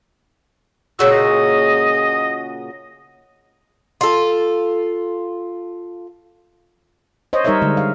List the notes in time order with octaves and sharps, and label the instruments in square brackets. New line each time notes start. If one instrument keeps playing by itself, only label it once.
[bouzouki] A#2 C#3 F#4 [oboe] E6
[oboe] D#5
[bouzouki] F4 A4
[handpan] C5 C#5 D#5
G3 D#4 A#4 C#5 D#5 E5
D3 G#3
F5